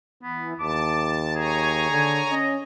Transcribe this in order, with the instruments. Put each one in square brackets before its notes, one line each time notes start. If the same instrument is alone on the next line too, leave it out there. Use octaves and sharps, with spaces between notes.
[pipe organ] E3 [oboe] B3
[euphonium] D#2 [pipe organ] A5 [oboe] D6
[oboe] G#4 [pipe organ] C#5 G#5 A#5
[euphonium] D3
[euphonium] C#4 [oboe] D#5